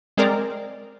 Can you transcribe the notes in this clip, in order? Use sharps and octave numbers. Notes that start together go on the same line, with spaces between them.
G#3 C4 A#4 D5